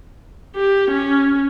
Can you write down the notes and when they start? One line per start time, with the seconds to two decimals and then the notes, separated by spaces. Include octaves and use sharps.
0.56 G4
0.91 C#4